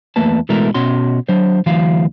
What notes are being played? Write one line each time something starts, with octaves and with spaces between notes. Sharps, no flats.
E2 A3 A#3 B4 A5
B2 E3 G#3 A3 A#4
B2 C#4 F#4 C6
F#3 D4 C5
D2 E3 F#3 F5